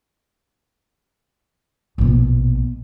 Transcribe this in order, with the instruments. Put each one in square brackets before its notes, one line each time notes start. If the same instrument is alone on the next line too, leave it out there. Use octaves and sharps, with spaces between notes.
[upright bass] A#1 B2